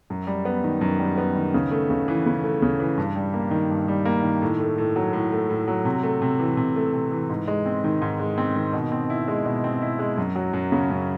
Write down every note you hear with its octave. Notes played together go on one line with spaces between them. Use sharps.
F#2
G3
B3
D#3
F#2
G3
B3
D#3
C#3
A3
C#3
E3
C#3
A3
C#3
E3
G2
G3
A#3
D#3
G2
G3
A#3
D#3
A2
A3
A2
F#3
A2
A3
A2
F#3
C3
A3
C3
E3
C3
A3
C3
E3
G#2
G#3
C4
D#3
G#2
G#3
C4
D#3
B2
C4
E4
G#3
B2
C4
E4
G#3
F#2
F#3
F#2
C#3
F#2